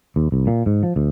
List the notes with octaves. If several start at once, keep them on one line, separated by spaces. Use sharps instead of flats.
D#2
C2
A#2
G#2
F3
D2